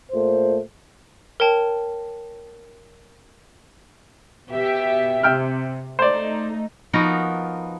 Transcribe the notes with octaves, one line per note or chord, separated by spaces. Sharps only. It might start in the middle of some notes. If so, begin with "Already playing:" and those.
A#2 A3 C5
A#4 C#5 G5 A5
B2 G4 E5
C3 E5 G5 F6
A3 D#4 C5 D5
F3 B3 D#4 F#4 A#4